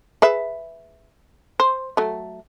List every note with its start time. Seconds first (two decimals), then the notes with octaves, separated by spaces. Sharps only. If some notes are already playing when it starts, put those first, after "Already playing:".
0.22 G#4 B4 E5
1.60 C5
1.97 F#3 A3